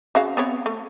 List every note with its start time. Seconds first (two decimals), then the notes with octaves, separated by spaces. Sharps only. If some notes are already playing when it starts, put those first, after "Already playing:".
0.15 C#3 F#4 F5
0.37 B3 C4 C#5
0.66 A3